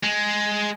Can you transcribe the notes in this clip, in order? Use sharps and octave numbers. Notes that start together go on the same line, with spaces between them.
G#3